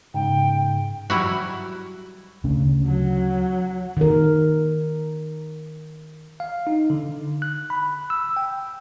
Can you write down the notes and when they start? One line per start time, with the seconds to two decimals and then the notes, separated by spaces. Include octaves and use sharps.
0.14 G#2 C#3 G5
1.10 F#3 G3 E4 F#4
2.44 D2 C#3
2.87 F#3
3.97 D#3 A#4
6.40 F5
6.67 D#4
6.90 D3
7.42 F#6
7.70 B5
8.10 E6
8.37 G5